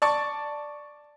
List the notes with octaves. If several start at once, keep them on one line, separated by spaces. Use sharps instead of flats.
D5 A5 C#6